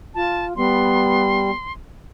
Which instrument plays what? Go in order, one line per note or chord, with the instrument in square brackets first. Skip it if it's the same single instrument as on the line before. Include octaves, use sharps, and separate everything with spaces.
[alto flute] F4 [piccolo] A5
[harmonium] G3 [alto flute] B3 [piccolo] C6